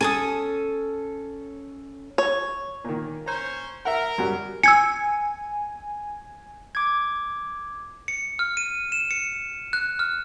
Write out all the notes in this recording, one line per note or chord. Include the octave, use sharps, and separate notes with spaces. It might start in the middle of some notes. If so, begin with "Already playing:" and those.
C#4 A4 G#5 A5 D#6
C#5
A#2 D#3
C#4 C5 C#5 A#5
A#4 E5 F#5
F#2 F#3 G3
G#5 E6 G#6 C#7
D6 G#6
C#7
F6
D#7
E7
C#7
F#6
F6